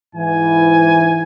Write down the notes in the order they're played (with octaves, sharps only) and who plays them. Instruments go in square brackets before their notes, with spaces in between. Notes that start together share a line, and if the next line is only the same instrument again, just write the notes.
[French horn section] G#2 E3 [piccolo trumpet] G#5